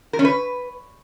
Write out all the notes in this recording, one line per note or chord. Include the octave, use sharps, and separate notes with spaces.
A#4
C#4
B4